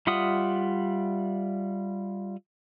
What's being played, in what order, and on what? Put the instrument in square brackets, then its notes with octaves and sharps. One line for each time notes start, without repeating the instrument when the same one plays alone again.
[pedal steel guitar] G3 F4 E5 F#5 D#6